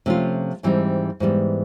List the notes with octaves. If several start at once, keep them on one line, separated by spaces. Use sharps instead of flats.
C3 F3 A3 C#4 F4
G#2 E3 G3 C4 D#4
G#2 E3 G3 B3